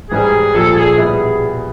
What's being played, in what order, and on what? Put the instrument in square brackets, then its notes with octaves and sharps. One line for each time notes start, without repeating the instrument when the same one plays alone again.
[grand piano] G#2 E3 G3 [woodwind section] G#4
[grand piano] A#1 A#2 F3 [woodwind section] A4
[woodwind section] G#4
[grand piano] B2 G3 E4 [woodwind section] G#4